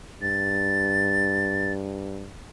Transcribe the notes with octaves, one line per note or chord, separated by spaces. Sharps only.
G2 A6